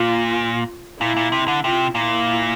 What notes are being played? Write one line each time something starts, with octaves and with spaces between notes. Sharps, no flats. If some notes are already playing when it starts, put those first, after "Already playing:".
Already playing: A#2 F4
A#2 E4
A#2
C3
D3
C3 F4
A#2 E4